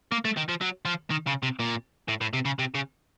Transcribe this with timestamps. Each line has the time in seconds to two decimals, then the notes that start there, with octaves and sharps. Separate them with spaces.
0.12 A#3
0.25 A3
0.37 D#3
0.49 F3
0.61 F#3
0.85 F3
1.10 D#3
1.27 C#3
1.43 C3
1.59 A#2
2.08 A2
2.21 A2
2.34 C3
2.45 C#3
2.59 C3
2.75 C#3